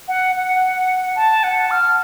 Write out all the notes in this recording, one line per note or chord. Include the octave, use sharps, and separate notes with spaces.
F#5
F#5
A5
F#5
F6